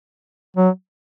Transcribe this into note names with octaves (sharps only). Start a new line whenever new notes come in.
F#3